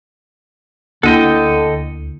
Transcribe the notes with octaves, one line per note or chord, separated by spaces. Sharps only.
D2 D3 A#3 E4 A4 D#5 G5